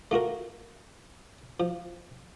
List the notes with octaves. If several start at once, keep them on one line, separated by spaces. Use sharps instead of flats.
A3 F4 F#4 A#4
F3